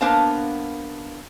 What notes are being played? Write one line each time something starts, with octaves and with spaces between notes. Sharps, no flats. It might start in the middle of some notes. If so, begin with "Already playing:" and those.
A#3 B3 D4 C5 F5 A5